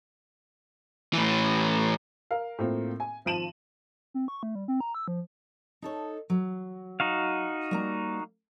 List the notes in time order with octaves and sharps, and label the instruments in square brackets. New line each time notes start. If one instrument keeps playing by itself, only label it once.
[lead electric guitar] A2 E3
[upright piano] A#4 F5
A2 A#3 C4 F4
G#5
G#1 F3 A5 D#7 E7 F#7
[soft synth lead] C4
C#6
A3
G3
C4
A#5
E6
F3
[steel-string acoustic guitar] D#4 A4 C#5
F#3
[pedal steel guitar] D#4 F#4 F5
[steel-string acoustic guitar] G3 A#3 A#5